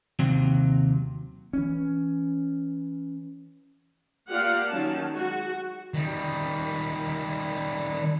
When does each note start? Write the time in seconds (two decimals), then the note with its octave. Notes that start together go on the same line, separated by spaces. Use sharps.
0.19 D#2 C3 F#3
1.53 E3 C#4
4.30 A#3 F4 G4 D5 F5 F#5
4.69 D#3 F#3 C#4 A5
5.12 G#3 F#4
5.94 D#3 G3